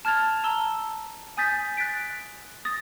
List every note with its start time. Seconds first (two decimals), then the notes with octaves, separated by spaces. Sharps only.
0.05 A5 F6 G#6 A6 F7
0.44 A5 A#5 E6 G7
1.37 G#5 D#6 G6 A6 B6
1.77 F#6 A6 B6 D7
2.65 D#6 A6 A#6